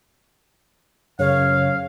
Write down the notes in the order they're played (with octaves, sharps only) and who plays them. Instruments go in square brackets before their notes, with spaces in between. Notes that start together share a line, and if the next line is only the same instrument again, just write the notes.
[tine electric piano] F#2 C#3 [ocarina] C#5 [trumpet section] F5